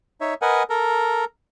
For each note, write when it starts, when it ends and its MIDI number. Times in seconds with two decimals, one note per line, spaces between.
0.21 0.34 63
0.21 0.34 73
0.21 0.34 76
0.42 0.63 70
0.42 0.63 71
0.42 0.63 75
0.42 0.63 78
0.42 0.63 80
0.70 1.25 69
0.70 1.25 70
0.70 1.25 82